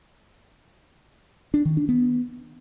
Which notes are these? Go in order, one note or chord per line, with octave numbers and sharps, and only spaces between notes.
D4
D#3
D4
B3